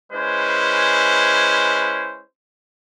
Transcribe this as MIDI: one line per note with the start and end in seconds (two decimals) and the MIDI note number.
0.13 2.22 56
0.13 2.22 61
0.13 2.22 64
0.13 2.22 71
0.13 2.22 72